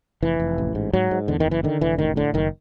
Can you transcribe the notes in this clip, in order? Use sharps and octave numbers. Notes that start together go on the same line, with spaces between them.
F1 E3
F1
A1
G#2
G#2 F#3
G#2
E2 D3
D#3
F#1
E3
D3 D#3
F1 E3
A1 D#3
A2 D3
F#1 D#3